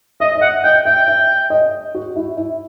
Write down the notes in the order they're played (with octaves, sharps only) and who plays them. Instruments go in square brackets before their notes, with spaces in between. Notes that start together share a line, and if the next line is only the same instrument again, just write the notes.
[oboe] D#5 [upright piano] E5
[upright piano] D#5
[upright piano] E5 [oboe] F#5
[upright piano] D#5 [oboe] G5
[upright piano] E5 [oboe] G5
[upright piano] E5
D#5
F#4
E4
E4